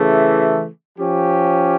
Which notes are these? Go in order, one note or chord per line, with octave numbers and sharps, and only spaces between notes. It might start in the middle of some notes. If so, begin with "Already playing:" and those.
Already playing: C#3 E3 A3
F3 C#4 G4